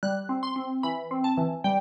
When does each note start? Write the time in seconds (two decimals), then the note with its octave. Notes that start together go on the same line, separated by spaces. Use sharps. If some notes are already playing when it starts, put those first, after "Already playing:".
0.03 G3 F#6
0.29 C4
0.43 C6
0.56 C4
0.83 E3 B5
1.11 C4
1.24 A5
1.37 E3
1.64 G3 G5